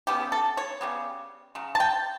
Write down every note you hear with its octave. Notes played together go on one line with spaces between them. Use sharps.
C#3 G3 B3 G4
A4
C#5
C#3 G3 B3
C#3 F#3
A5
G5